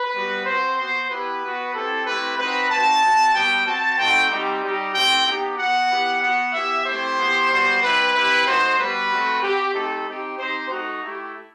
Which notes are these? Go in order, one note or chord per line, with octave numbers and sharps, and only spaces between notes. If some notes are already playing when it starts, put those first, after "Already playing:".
Already playing: B4
G3 B3 F#4
C4 F#4 C5
B3 F#4 C5
B3 E4 G4 B4
B3 F#4
C4 E4 G4 A4
A3 C4 E4 G4 B4
C4 D#4 F#4 B4
C4 D#4 F#4 A5
C4 F#4
G3 B3 F#4 G5
C4 F#4 A5
A3 C4 D#4 F#4 G5
G3 C4 D#4 G4
G3 D#4 G4
A3 C4 E4 G4 G5
B3 D#4 G4
B3 F#4 F#5
B3 E4 G4
B3 F#4 F#5
B3 E4 G4 E5
A3 C4 E4 G4 C5
B3 E4 G4
G3 B3 F#4
G3 C4 E4 G4 B4
C4 E4 G4 B4
A3 D#4 F#4 C5
G3 B3 F#4 B4
A3 C4 F#4
C4 F#4 G4
A3 C4 D#4 G4 A4
C4 D#4 G4
C4 D#4 G4 C5
A3 D#4 F#4
A3 E4 G4